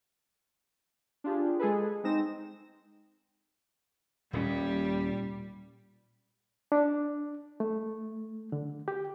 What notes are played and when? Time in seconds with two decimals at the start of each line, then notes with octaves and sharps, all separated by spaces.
1.24 D4 F4 G4 G#4
1.59 G#3 G#4 A4 B4
2.04 G#3 C4 D#4 A#6 E7
4.33 D#1 D#2 A#2 G3 C#4
6.72 D4
7.60 A3
8.52 D3
8.88 G4